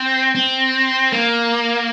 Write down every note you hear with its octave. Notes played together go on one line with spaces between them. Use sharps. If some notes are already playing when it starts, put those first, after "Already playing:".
Already playing: C4
C4
A#3